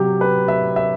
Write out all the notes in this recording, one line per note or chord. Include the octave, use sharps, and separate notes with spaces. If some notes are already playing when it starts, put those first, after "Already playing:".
Already playing: C3 F#3 G4
B4
E5
E5